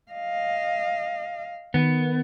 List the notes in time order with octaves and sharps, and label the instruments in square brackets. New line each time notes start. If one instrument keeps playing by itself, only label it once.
[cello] D#5 F5
[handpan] D#3 [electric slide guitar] B3